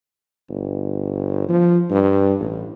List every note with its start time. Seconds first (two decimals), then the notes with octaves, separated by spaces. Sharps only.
0.49 G1
1.49 F3
1.91 G2
2.40 A1